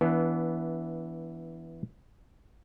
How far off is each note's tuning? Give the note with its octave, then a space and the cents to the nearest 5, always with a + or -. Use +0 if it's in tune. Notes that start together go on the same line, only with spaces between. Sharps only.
E3 -5 B3 -15 D4 -40